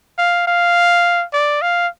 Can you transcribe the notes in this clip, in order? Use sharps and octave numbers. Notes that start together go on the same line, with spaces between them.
F5
F5
D5
F5